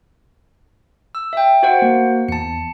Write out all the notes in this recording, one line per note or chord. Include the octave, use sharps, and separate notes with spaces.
E6
E5 G5
F#4 C5 F#5
A#3
E2 A5 C#7